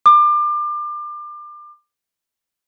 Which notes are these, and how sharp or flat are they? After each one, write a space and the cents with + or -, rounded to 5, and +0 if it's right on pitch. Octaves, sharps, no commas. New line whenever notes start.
D6 +30